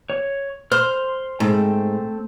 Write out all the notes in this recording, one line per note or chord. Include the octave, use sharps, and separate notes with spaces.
C#5
C5 C6 F6
G#2 A3 C4